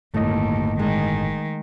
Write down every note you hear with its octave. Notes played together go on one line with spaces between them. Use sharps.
G1 D#2 A2 A3 D#5
D#3 G#3